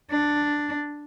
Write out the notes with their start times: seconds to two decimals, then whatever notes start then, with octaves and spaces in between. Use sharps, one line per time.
0.11 D4